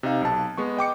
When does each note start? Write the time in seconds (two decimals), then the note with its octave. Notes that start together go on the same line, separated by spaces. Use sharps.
0.03 C3 D#4 F5
0.22 B1 A5
0.57 G#3 B3 C#6
0.77 D#5 G5 D6 C#7